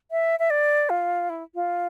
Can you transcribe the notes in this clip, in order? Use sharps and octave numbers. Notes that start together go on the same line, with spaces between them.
E5
E5
D5
F4
E4
F4